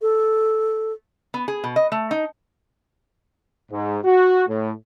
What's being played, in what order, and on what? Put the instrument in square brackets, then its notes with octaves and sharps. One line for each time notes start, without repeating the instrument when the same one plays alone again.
[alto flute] A4
[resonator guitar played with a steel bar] B3
G#4
B2
D#5
A3
D#4
[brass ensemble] G#2
F#4
A2